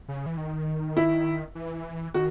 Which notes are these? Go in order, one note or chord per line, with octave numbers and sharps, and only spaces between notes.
C#3
E3
D#3
E4
E3
D#3 F#4